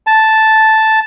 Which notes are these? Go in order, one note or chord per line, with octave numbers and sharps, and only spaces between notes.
A5